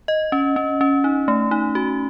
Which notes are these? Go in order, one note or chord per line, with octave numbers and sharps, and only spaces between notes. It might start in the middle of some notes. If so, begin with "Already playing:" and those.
D#5
C#4
C#4
C#4
D#4
A3
D#4
F#4